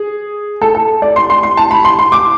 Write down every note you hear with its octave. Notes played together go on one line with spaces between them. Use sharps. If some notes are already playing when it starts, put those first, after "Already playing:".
Already playing: G#4
A4
A4
D5
C6
C6
C6
A5
B5
C6
C6
D6